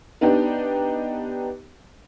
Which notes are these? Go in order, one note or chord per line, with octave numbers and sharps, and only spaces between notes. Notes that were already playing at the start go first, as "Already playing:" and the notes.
B3 D4 D#4 G4